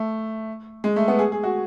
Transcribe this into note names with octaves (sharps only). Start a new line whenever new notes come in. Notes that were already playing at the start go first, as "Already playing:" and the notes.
Already playing: A3
G#3
A3
B3
G#4
G#4
F#4